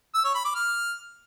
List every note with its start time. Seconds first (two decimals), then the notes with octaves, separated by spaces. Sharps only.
0.14 E6
0.25 C#5
0.35 B5
0.45 D6
0.55 F6